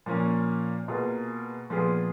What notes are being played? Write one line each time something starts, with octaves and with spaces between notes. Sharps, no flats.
A#2 F3 A#3 C#4
B2 A#3 F4 G#4
A#2 F3 B3 F4 G#4